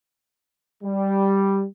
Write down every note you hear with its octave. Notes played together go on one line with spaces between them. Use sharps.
G3